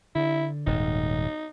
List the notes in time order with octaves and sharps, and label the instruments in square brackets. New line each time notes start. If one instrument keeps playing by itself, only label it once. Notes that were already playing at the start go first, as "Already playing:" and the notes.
[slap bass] D3 [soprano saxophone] E4
[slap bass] D#1 G#2 [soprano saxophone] D#4